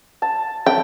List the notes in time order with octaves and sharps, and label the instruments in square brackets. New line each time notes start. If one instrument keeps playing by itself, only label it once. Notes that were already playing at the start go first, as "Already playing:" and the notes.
[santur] A5
[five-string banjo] G5